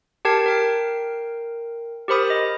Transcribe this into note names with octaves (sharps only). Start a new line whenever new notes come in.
G4 A#4 G5 A5 G#6 C7
A#4 G5 C7
G4 A#4 C5 B5 D#6
D#5